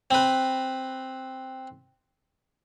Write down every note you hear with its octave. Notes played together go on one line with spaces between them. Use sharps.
C4 B4